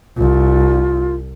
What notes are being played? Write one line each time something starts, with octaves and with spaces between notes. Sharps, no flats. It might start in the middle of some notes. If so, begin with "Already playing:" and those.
C2 F4